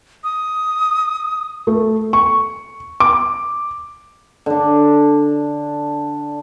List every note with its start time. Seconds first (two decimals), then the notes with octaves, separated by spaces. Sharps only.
0.24 D#6
1.67 A3
2.13 C#6
3.00 D6
4.46 D3 D4